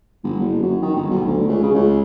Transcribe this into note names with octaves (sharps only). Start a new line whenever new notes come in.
G1
F#1
F#2
D#3
G1
B1
D2
C#2
C#3
C#2